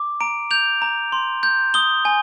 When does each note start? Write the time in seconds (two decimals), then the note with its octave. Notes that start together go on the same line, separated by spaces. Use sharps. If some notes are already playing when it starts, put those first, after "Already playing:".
Already playing: D6
0.21 A#5 D7
0.51 G6 F7
0.82 A#5
1.12 C6
1.43 G6
1.74 D#6 G7
2.05 G#5